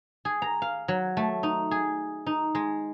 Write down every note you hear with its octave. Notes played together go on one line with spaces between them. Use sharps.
G#4
A#5
F5
F#3
A3
D#4
G#4
D#4
G#3